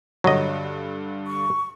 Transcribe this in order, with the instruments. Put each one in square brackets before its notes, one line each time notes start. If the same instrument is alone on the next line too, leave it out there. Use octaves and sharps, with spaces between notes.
[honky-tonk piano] G2 D3 [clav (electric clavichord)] F#3 D#5
[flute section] C#6